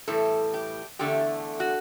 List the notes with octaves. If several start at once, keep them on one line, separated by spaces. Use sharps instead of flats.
A2 E3 G3 A4
G4
E2 D3 A3 G4
F#4